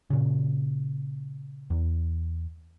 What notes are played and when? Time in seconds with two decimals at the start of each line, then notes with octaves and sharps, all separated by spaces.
0.10 A#2 C#3
1.70 E2